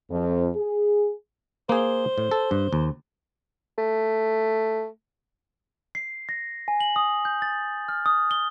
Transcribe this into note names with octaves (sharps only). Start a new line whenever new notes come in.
F2
G#4
A#3 G#4 C5
A2
A4
G2
D#2
A3
C7
A#6
G#5
F#7
D#6
G6
A6
F6
D#6
G7